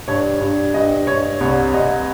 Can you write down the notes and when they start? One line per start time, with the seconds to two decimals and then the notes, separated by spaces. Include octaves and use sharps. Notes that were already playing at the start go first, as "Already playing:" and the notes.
0.08 G2 C#5
0.41 G2
0.74 G2 D#5
1.07 G2 C#5
1.40 C2 C#5
1.74 C2 D#5